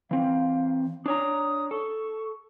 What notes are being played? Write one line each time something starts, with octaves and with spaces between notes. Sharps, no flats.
E3 C4 F5
D4 C#5 A#5 D#6
A4 C#6